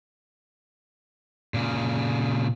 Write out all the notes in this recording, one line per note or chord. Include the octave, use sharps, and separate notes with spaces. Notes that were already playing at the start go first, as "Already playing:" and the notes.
A#2 C#3